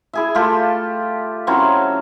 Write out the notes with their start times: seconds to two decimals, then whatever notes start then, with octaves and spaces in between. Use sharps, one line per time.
0.13 E4 G#4 E5
0.35 A3 F4 G4 A4
1.47 F#3 C4 C#4 E4